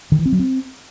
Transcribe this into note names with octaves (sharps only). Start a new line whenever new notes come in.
D#3
E3
C4
F#3
C4